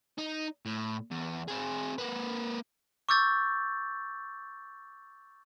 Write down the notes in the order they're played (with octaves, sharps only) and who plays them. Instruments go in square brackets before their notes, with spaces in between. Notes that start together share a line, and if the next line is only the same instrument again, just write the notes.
[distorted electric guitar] D#4
A2
E2
C4 G#4
A#3 B4
[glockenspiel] C#6 D6 E6 G6 A6